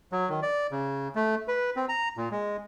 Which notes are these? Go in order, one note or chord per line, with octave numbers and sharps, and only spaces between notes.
F#3
D#3
D5
C#3
A3
B4
C4
A#5
A#2
G#3